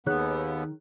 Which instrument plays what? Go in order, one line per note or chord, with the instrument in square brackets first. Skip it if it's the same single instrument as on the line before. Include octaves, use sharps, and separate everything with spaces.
[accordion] D#2 B3 [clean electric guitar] D#3 [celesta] G#4 C#5 F#6